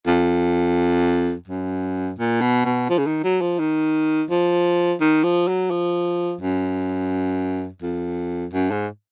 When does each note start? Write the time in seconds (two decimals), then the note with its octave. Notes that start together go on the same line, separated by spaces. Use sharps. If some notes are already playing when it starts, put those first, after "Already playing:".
0.07 F2
1.48 F#2
2.19 A#2
2.41 B2
2.65 B2
2.89 F3
2.98 C#3
3.07 D#3
3.24 F#3
3.41 F3
3.59 D#3
4.30 F3
5.01 D#3
5.24 F3
5.48 F#3
5.71 F3
6.41 F#2
7.82 F2
8.53 F#2
8.71 G#2